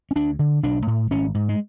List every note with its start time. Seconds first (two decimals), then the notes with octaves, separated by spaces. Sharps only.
0.11 C#4
0.16 D2 D4
0.39 D3
0.63 B1 D4
0.87 A2
1.11 G#1 C#4
1.34 G#2
1.49 G#3